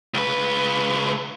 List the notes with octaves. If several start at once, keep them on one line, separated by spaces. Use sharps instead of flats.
C#2 B4